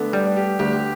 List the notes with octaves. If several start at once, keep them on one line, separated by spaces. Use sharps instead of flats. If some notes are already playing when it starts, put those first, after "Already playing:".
Already playing: D3 A3 B3
G3 D4
G4
D2 G4
G4